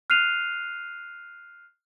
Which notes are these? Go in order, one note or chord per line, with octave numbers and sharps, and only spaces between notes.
F6 F#6 C7 D#7 F7